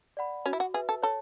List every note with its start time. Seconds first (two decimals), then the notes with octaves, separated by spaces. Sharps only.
0.17 D5 F#5 B5
0.46 C#4 F#4
0.53 E4
0.60 F#4
0.74 G#4 B4 E5
0.89 A4
1.02 A4 C#5